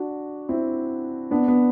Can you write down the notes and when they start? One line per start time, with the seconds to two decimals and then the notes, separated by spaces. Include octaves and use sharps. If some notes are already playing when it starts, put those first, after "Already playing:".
Already playing: D4 F#4
0.49 C4 E4
1.31 B3 D4
1.48 B3